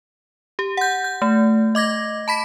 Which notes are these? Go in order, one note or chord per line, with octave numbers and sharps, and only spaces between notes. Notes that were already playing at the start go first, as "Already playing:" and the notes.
G4
F#5 G6
G6
A3
D#5 D6 G#6 A#6
A5 B5 B6